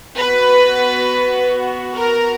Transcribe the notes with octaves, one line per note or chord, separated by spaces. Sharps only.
B3 F#4 B4
A#4